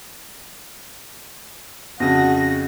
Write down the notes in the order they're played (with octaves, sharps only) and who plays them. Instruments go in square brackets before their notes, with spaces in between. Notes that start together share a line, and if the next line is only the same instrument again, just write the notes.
[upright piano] F2 C#3 [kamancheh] F#4 [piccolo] A#6